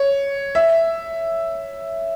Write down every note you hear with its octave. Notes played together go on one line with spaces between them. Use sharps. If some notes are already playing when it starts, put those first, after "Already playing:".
Already playing: C#5
E5